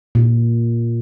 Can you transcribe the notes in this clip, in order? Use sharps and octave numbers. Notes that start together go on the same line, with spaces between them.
A#2